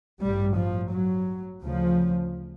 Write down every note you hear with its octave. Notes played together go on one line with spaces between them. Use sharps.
A1 G2 G3
F3
F#3
D2 C#3 F3